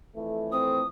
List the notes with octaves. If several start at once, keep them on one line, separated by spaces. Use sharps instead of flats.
F2 E3 A3
C4 D#6